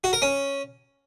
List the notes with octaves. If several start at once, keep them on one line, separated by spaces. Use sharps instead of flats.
F#4
A#4
C#4